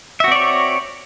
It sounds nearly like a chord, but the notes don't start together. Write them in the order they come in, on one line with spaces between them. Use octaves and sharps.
E5 F#4 C4 D5 C#5